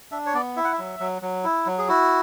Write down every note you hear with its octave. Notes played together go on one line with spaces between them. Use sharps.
D4 E5
C#5
B3 D5
E4 E5
F#5
E5
F#3
F#3
F#3
E4
F#3
G#4
E4 F#4